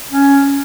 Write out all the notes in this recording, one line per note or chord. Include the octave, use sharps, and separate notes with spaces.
C#4